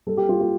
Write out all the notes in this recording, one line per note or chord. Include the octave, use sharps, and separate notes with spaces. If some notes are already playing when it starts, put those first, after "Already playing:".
G3 A4
G4
G3 F4
F4